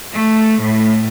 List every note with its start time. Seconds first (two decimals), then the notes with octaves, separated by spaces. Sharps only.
0.14 A3
0.63 A2